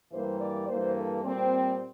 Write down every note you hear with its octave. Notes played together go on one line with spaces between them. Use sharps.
G2 E3 G3 A#3 C5
D5
G2 E3 A#3 C5
A4
A#2 G3 C4